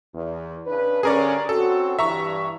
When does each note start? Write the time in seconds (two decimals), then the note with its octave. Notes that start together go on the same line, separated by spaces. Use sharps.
0.14 E2
0.67 C#3 D4 B4
1.03 G2 D3 C#4 G#4 A#4 D5
1.49 C4 C#4 F#4 A4
1.99 G2 E3 E5 A#5 C#6